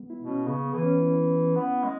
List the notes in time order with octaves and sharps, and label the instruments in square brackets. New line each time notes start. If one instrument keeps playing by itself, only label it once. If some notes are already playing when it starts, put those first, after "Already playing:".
Already playing: [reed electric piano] G#3 B3
E4
[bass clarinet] B2
[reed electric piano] C#4
[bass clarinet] C#3 [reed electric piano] B3
[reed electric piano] B3
[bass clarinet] E3
[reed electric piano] C#4
E4
[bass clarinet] B3
G#3